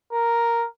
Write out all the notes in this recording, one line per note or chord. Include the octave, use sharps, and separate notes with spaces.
A#4